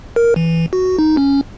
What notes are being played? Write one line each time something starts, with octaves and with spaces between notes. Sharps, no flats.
A#4
E3
F#4
D#4
C#4